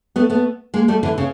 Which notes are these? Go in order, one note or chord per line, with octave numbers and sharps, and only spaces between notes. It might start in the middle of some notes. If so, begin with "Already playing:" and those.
A3 B3
A3 B3
G#3 A#3
G3 A3
D3 E3
C#3